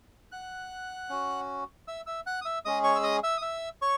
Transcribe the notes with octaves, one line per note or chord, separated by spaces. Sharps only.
F#5 F#6
C#4 F#4
E5 E6
E5 E6
F#5 F#6
D#6
E5 E6
G#3 C#4 G#4 D#5 D#6
C#5 C#6
E6
D#5 D#6
E5 E6
D#6
E5 E6
C#5 C#6